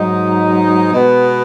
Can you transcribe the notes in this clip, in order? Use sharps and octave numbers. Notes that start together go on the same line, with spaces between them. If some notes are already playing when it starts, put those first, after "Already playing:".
Already playing: G#2 F#3 D#4
B2 G#3 B3